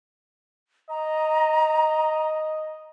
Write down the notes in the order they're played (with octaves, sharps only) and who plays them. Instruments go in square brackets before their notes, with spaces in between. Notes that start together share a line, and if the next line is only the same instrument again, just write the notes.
[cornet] D#5 [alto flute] A#5